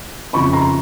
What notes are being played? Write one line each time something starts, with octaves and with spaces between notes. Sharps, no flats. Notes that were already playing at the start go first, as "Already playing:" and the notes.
F2 C#3 F3 B5 C#6
A#5 C6